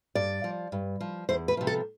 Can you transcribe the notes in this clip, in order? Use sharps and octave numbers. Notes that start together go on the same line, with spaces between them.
G2 D5
F3
G2
F3
E2 C5
B4
C3 F3
A4